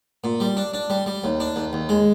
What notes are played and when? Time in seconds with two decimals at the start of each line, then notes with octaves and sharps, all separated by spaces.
0.24 A#2
0.40 G3
0.57 D4
0.74 D4
0.90 G3
1.06 G3
1.24 D#2
1.40 D4
1.56 D#2
1.73 D#2
1.89 G#3